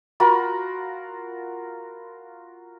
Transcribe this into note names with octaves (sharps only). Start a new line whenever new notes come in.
F4 F#4 A#4 B5